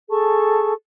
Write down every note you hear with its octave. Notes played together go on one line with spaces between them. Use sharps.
G#4 A4 A5 C#6